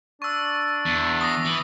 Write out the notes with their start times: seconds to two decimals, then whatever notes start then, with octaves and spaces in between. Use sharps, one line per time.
0.22 D4 C#6 E6
0.85 E2
1.21 D#6 A#6
1.45 E3